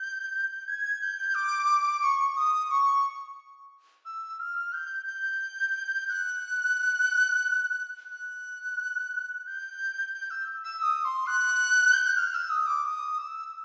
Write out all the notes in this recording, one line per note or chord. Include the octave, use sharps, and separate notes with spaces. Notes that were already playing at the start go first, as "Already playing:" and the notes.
Already playing: G6
G#6
G6
D6
C#6
D#6
C#6
E6
F6
G6
G6
F#6
F#6
G6
G6
E6
E6
D#6
C6
F#6
G6
F#6
F6
E6
D#6
D6
D#6
E6